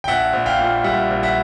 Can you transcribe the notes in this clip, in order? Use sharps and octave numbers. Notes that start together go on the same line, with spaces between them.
G5
A#1 E5 F#5
A#1
F5 G5
A#2
G3 E5 F#5
A#1
E5 F#5